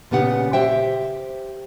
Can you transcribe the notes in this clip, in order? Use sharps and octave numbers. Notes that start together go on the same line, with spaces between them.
A#2 C#3 B3 G4 F#5
G4 C5 E5 G5